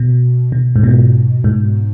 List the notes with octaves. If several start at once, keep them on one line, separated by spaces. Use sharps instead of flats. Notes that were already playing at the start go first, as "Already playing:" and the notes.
Already playing: B2
B2
G#2
B2
G#2